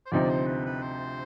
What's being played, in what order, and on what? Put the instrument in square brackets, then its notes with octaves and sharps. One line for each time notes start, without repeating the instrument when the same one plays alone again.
[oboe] C5
[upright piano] D2 C3 F3 C4 D#4 [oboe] D5
[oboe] C5
B4
B4
C5